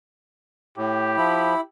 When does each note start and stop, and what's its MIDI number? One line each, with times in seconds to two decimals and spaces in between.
0.78 1.17 45
0.78 1.65 67
1.17 1.55 53
1.17 1.61 64
1.17 1.61 83